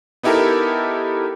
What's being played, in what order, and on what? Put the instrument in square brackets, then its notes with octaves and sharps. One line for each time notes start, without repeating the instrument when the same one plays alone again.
[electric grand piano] B3 D#4 E4 G4 A4 A#4